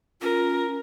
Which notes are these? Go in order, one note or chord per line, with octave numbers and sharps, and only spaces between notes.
C#4 F4 A#4